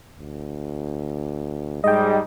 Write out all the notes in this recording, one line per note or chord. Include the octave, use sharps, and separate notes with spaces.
D2
G#2 G3 G#4 D#5 G5